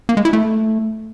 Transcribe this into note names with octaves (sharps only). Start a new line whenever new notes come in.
A#3
G#3
E4
A3